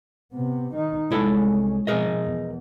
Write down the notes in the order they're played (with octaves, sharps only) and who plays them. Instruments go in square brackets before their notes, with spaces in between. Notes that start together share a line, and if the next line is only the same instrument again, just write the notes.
[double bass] C3 B3
D#3 D#4
[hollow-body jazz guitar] C2 E4 A4 [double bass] G#3 C#4
[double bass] B2 F3 [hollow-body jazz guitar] G#4 A#4 D#5
[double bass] E2